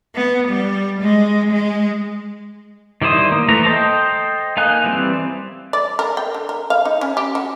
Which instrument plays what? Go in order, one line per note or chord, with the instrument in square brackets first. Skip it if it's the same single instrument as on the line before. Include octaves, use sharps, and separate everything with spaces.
[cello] B3
G3
G#3
G#3
[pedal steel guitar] D#3 G3 E4 C5 D#6
A#3
E3 A3 A#5
A4 C5 D#5 G5
A#3 D#4 F5 G#5 F#6
E3 G3 C4
[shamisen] D5
A#4
G5
D3
A#4
F5
D#4
C#4
G4
F#4